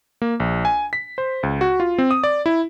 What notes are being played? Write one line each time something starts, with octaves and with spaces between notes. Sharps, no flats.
A#3
A#1
G#5
B6
C5
C#2
F#4
F4
C4
D#6
D5
E4